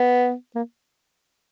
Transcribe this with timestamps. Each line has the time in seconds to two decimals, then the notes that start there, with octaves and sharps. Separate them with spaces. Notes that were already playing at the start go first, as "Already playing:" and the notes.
Already playing: B3
0.55 A#3